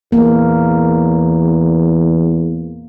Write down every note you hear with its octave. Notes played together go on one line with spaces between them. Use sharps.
E2 A#3